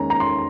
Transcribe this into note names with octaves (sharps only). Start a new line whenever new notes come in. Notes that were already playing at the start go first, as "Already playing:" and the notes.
Already playing: D#3 G#3 C#4 A#5
A#5
C6